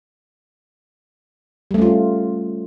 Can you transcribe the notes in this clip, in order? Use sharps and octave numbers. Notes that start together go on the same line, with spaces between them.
G3 A3 C#4 F4